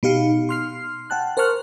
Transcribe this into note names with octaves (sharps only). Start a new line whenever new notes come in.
B2 D#4 G4 F5 C#7
C6 F6 C7
F#5 G5 A5 F#6
A#4 C5 A5 C#6 F6 F#6